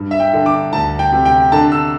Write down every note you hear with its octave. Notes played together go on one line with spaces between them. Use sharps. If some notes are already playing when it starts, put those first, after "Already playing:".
Already playing: G2
E5
G5
D3
D6
D2 A5
G5
C3
G5
D3 A5
E6